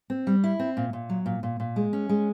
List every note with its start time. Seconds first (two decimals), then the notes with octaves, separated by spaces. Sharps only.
0.10 C4
0.27 G3
0.44 E4
0.59 C4
0.77 A#2
0.93 A#2
1.10 F#3
1.26 A#2
1.43 A#2
1.60 A#2
1.76 G#3
1.93 C#4
2.09 G#3